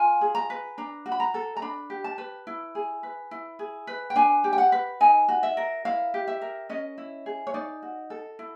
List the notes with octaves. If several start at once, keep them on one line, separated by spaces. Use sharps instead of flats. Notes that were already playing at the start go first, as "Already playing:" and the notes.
Already playing: F4 G#5
G#4
A#5
B4
D4 A#5
F#4
B5
A#5
A4
A#5
D4 B5
G4
A5
B4
E4
G#4
B4
E4
G#4
B4
G5
D4 G#5
G4
G5
F#5
B4
D#4 G#5
F#4
E5
A#4
E4 F5
G4
E5
A#4
C#4 D#5
E4
G#4
C#5
D#4 D5
F#4
A4
E4